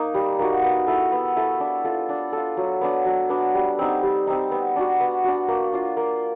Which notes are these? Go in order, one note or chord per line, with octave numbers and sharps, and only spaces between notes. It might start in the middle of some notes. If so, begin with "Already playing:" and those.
Already playing: A#3 D#4
G3
A#3 D#4 F#4
B3
E4 A4
B3
E4 A4
D4
F4 A4
D4
F4 A4
F#3
B3 D4
F#3
B3 D4
G3
C4 D#4
G3
C4 D#4
B3
D4 F#4
B3
D4 F#4
A#3
D4 F4
A#3